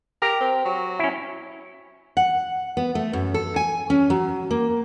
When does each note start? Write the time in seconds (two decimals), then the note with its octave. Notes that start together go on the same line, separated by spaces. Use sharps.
0.22 G4 A#4
0.40 C4
0.65 F#3
0.99 C#4 E4
2.17 F#5
2.77 B3
2.95 A3
3.13 F#2
3.34 A4
3.56 G#5
3.90 C#4
4.10 F#3
4.51 A#3